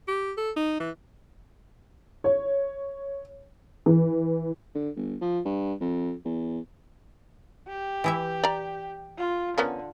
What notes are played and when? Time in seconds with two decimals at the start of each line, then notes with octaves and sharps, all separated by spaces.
0.08 G4
0.37 A4
0.56 D#4
0.80 E3
2.24 C#5
3.86 E3
4.75 D3
4.96 G1
5.21 F3
5.45 G2
5.80 F2
6.25 E2
7.68 G4
8.04 E3 E4 E5
8.44 D5 A#5
9.18 F4
9.58 D3 B3 C#4 A#4